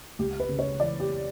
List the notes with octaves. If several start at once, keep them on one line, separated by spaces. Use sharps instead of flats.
C#2 G4
B4
C#3
C#5
E3 D5
G4